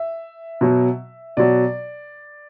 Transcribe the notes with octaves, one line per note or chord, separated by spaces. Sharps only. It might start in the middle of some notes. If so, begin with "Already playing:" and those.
Already playing: E5
B2 F#3
B2 F#3 D5